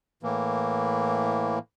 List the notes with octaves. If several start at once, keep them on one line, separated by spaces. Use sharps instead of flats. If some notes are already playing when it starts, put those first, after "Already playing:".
A2 E3 A#3